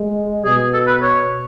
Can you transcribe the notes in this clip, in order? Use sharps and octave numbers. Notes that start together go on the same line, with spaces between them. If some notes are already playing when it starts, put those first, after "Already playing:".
Already playing: G#3
B2 G#4
A4
B4
C#5